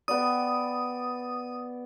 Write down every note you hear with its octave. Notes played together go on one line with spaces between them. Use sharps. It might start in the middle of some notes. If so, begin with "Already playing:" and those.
B3 G4 D5 D#6